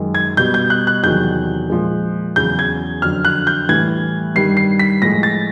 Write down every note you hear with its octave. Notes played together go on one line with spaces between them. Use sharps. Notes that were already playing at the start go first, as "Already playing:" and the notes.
Already playing: F#2 D#3 G#3
G#6
B2 G3 G6
G6
F#6
F#6
E2 C3 D#3 F#3 G6
A#2 F3 G#3
E2 C#3 F#3 G6
G#6
F2 D3 F#3 F6
F#6
G6
A2 E3 G3 G#6
G2 D#3 G3 C7
C7
B6
A2 F3 G#3 A#6
A6